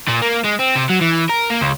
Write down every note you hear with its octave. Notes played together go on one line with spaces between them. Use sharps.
A#2
A#3
G#3
C4
C3
F#3
E3
A#4
A#3
C#2